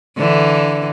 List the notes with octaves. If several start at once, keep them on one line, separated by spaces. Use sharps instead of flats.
D3 E3